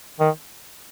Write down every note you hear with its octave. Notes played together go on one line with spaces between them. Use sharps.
D#3